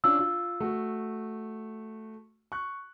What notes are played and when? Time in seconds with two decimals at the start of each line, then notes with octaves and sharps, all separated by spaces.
0.04 C#4 D4 F4 E6
0.19 F4
0.60 A3 F#4
2.52 C#6 F#6